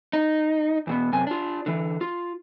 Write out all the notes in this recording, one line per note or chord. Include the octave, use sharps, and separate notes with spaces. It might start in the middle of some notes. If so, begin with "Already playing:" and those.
D#4
E2 B2 B3
F#2 C3 G#5
D4 F4
D3 E3
F4